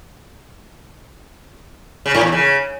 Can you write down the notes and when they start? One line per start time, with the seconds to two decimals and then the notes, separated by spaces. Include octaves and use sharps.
2.06 C#3
2.14 A2
2.23 E2
2.32 C#3